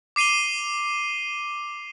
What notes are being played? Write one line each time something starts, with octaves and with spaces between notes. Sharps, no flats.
D6 C7 D#7 F7 G7